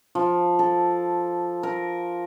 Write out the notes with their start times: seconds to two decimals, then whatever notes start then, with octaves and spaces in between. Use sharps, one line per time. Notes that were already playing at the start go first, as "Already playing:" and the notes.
0.15 F3
0.59 A4
1.63 A#4